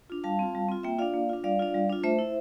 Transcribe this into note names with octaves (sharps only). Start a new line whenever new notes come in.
D4 F4
G3 F5 A5
C4 F4
G3
C4 F4
A#3 E5 G5
D4 F4 D5 F5
A#3
D4 F4
G3 D5 F5
D4 F4
G3
D4 F4
A3 C5 E5
E4